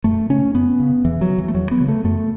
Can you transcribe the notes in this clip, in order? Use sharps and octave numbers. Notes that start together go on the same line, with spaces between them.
F#2 A3
C#3 C#4
F#2 B3
C#3
E2 E3
F#3
C#3
E3
A3
E2 F#3
B3
C#3
A3
F#2 A3